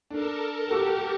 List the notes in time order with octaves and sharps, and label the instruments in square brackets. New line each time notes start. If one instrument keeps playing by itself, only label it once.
[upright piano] D4 [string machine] A4 A#4 A5
[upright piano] F#4 E6 [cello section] G4